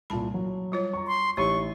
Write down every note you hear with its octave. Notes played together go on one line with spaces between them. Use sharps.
C2 A#2 A5 B5
F#3
G3 F4 C#5
A#5 C#6
C6
A1 D#4 G4 C#5 C#6